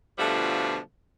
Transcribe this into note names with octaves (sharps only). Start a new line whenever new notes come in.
B2 D3 F3 G3 A3 F4